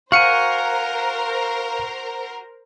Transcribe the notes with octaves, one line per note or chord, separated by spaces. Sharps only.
F#4 A#4 C5 F5 G#5 F6 C#7